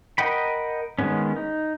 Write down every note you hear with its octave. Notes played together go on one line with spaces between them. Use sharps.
A#4 D#5 F#5 G5 B5
D#3 G#3 B3 C#4
D#4